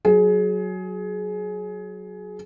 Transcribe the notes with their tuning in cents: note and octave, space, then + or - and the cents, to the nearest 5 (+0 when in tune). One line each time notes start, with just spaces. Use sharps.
F#3 +0 G#4 +20